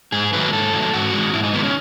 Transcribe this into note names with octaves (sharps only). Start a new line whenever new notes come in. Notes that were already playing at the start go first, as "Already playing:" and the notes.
G#2 G#4
D#3 F#3 A3 B4
G#2 A4
D#3 F#3 A3
G#2 F#4
D#3 G#3
G#2 E4
D#4
D#3 G#3 B3
C#4